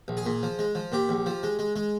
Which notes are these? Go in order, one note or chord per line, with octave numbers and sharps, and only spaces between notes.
A#1
G#4
A#2
F3
G#3
F3
A#2 G4
A#1
F3
G#3
G#3
G#3